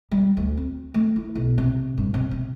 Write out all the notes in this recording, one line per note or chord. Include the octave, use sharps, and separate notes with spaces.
G3
D2
C4
A3
E4
B1
C3
G2
C3
C3